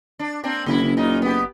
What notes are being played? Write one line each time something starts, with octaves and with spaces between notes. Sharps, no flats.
D4
A#3 C4 D4
F#1 C#3 E4
A#2 F#3 D#4
B3 G4